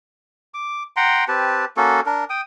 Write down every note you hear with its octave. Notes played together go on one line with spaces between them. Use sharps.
D6
F#5 G5 A#5 C6
C4 G4 B4 A5
A#3 C#4 F#4 A4
D4 A#4
G5 D#6